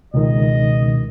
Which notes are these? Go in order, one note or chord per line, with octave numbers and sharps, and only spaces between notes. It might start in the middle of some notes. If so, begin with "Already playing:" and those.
C#2 B2 D#3 D#5